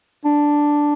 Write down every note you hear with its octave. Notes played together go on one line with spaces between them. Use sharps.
D4